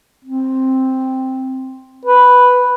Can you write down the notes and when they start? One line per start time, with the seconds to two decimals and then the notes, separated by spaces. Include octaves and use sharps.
0.24 C4
2.05 B4